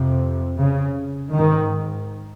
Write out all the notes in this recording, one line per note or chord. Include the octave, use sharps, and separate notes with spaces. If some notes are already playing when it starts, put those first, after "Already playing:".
Already playing: F2 C3
C#3
G#2 D#3